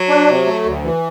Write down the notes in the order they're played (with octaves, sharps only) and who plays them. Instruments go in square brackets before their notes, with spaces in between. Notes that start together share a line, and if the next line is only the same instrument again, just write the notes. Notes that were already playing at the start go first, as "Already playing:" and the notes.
Already playing: [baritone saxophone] F#3
[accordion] D4
C3
A3
D2
E3